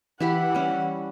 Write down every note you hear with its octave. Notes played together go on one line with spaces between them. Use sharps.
E3 E4 G4 F#5 B5
G3 C#4